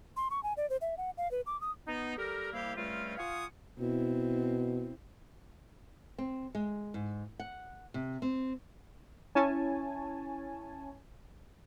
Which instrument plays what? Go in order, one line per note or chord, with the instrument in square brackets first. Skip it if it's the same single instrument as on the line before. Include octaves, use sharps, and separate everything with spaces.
[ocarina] C6
C#6
G#5
D5
C5
E5
F#5
F5
B4
D6
D#6
[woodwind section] B3 D#4
G3 G4 A4 A#4
C2 G3 A#3 E4 G4 F5
C#2 G3 A3 C4 C#4 F4
F4 F5 F#5 G#5 C#6 D#6
[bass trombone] B2 [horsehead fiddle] C4 E4
[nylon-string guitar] C4
G#3
G#2
F#5
C3
C4
[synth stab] C#4 E4 C#5 G#5 A5